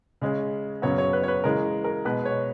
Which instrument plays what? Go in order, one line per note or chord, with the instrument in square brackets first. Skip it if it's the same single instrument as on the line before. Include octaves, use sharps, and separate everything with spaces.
[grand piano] C#3 G#3 C#4
F#2 C#3 F#3 B3 C#5
C#5
B4
C#5
B4
C#3 E3 G#3 A#4
A#4
B2 G#3 B3 B4
C#5